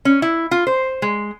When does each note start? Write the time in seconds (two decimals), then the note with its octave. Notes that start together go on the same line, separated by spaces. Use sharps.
0.05 C#4
0.22 E4
0.51 F4
0.67 C5
1.02 G#3